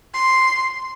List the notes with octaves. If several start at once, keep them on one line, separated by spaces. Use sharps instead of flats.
C6